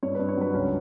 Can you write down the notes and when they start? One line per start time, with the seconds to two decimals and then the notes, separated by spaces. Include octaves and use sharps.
0.03 G2 C#5
0.15 G2 B4
0.29 C#5
0.37 F#3 B4
0.54 C#2 C#4